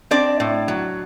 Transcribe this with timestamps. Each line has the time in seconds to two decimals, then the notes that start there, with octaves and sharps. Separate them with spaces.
0.11 C4 D4 D5
0.40 A2
0.68 F#3